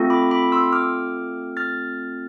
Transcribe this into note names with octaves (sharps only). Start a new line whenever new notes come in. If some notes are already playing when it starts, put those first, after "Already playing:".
Already playing: A3 C4 F4 A4
B5 D6
B5 D6
C6 E6
D6 F6
F6 A6